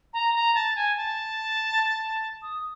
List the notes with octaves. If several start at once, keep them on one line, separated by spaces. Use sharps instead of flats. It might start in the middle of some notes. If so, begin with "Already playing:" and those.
A#5
A#5
A5
G#5
A5
D#6